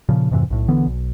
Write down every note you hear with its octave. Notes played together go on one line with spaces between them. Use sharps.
A#2 C#3 F3
F2 G#2 C3 E3
B1 A2
B1 D3 E3 B3
B1